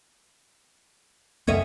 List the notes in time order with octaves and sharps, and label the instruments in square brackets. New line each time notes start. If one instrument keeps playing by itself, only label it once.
[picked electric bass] C#2 F#2 A3 [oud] C#4 D#5 E5